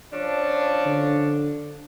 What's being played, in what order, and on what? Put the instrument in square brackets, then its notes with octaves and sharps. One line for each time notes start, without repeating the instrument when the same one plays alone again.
[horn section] F3 C#4 D4
[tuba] D3